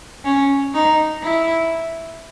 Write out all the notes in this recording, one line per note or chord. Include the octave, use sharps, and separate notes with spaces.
C#4
D#4
E4